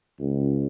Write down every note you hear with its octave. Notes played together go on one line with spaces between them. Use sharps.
C#2